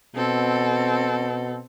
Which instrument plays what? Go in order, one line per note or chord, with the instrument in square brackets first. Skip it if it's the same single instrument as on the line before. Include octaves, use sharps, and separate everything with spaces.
[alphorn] B2 [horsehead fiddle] C4 A4